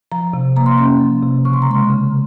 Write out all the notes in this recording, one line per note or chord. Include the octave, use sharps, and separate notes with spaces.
F3 A#5
C3
A#3 A#5
C6
C#4 A#5
F3
C3
C#3 C#6
C6
A#5
G#3 C6
C#3